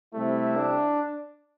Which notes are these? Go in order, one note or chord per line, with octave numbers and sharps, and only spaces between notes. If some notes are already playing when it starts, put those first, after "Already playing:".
C3 G3 A3 C4 E4
D4